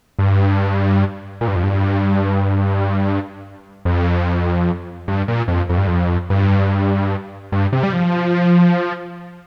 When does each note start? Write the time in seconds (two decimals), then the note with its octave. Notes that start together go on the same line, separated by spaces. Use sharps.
0.19 G2
1.41 A#2
1.48 G2
1.56 F2
1.63 G2
3.85 F2
5.08 G2
5.28 A#2
5.48 F2
5.69 F2
5.77 G2
5.87 F2
6.30 G2
7.52 G2
7.73 C3
7.83 G3
7.93 F3